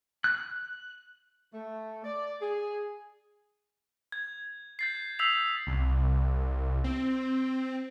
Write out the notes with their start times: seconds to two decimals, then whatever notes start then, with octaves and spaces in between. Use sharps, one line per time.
0.24 F#6
1.53 A3
2.04 D5
2.41 G#4
4.12 G#6
4.79 G6 A6 C7
5.19 D#6 E6 G6 B6 C7 F7
5.67 C2
6.84 C4